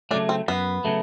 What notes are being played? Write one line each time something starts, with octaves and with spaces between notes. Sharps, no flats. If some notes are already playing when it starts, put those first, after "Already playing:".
C#3 F#3 A3 D4
C4
F#2 B3
C#3 F#3 A3